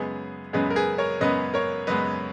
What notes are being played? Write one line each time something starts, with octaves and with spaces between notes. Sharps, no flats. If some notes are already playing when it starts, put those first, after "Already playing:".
Already playing: F#2 C#3 G#3 B3 G#4 B4
F#2 C#3 G#3 B3 G#4 B4
A#4
G#4 B4
A#4 C#5
F#2 C#3 G#3 B3 B4 D#5
A#4 C#5
F#2 C#3 G#3 B3 B4 D#5